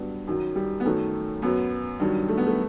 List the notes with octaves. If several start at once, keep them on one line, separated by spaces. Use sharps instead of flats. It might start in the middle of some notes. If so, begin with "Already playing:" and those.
Already playing: G2 F#3 B3
F#2 D#3 F#3
G3
B3
F#2 D#3 F#3 A3
F#2 F#3 B3
G2 D#3 F#3
A3
B3
A3